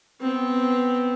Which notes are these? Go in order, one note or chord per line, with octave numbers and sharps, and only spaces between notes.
B3 C4